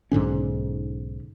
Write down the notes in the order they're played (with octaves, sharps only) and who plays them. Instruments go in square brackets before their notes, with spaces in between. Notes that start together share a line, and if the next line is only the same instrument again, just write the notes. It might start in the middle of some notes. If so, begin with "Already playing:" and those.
[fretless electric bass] B1 G#2 D3 C#4